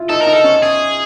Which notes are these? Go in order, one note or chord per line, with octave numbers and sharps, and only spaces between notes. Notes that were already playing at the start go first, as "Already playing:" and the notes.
Already playing: E4 F4
D#4 A4
D#4 A#4
A4
C#4
G#4